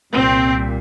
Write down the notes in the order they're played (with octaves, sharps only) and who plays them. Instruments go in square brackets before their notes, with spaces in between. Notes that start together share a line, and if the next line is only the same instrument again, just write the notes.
[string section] C2 A#2 C4